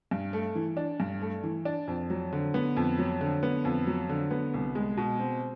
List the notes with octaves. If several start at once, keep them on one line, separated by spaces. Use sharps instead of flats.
G2
A3
E3
D4
G2
A3
E3
D4
F2
F#3
D3
B3
F2
F#3
D3
B3
F2
F#3
D3
B3
C2
G#3
B2
C4